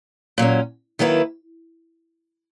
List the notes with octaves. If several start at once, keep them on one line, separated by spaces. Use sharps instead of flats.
A#2 F#3 C#4
D#3 F#3 A#3 E4 B4